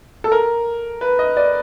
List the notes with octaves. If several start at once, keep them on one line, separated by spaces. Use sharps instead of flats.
A4
A#4
B4
D#5
D5